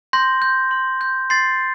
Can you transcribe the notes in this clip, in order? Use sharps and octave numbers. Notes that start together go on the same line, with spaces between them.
C6 G6 A#6
G6
C6
G6
C6 A6 C7